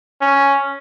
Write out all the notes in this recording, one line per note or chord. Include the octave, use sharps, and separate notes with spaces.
C#4